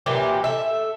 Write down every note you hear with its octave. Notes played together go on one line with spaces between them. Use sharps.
A#2 E3 F#3 G4
A4 E5